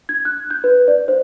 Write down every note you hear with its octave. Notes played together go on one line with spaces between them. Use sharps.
G#6
F#6
G6
B4
D5
C5